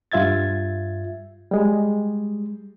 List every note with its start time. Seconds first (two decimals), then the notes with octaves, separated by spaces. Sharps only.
0.12 G2 F4 E5 G#6 A6
1.51 G3 G#3